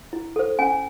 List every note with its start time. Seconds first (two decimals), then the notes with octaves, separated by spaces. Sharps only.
0.13 E4
0.36 A4 C5
0.59 C#4 G#5